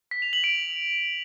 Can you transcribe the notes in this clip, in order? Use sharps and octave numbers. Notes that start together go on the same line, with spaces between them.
B6
F7
F#7
D7